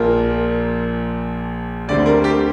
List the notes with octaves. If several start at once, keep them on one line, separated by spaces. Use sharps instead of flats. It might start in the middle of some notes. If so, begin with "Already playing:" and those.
Already playing: A#1 A#2 F3 A#3 A#4
D2 D3 G3 C4 D5
A#4
G4